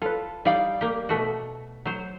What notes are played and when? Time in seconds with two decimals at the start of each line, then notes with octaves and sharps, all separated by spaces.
0.02 F4 A4 B4
0.45 G3 D#4 D5 F5 G5
0.81 A#3 G4
1.09 B2 A3 F#4
1.85 F#3 C5